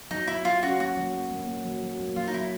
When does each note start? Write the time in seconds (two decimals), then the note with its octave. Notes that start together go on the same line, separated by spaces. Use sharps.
0.11 F#3 D#4
0.27 F#3 E4
0.45 F#3 F4
0.63 C#4 F#4
0.80 A#3 F#4
0.97 F#3
1.14 A#3
1.31 A#3
1.48 A#3
1.65 F#3
1.83 F#3
2.00 A#3
2.16 F#3 F4
2.27 D#4
2.34 F#3 E4